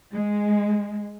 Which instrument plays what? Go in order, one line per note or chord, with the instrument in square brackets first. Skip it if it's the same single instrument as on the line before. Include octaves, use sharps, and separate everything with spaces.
[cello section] G#3